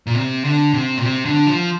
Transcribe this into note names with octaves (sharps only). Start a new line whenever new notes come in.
A#2
C3
D3
C3
A#2
C3
D3
F3